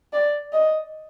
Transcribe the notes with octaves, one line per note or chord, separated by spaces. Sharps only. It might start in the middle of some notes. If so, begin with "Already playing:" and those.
D5
D#5